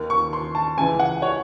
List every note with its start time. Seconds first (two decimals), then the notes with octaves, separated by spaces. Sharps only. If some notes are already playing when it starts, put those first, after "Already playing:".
Already playing: D#2 D#3
0.10 C#6
0.33 C6
0.55 A5
0.77 C#2 C#3 E3 G#5
0.99 F#5
1.22 C#5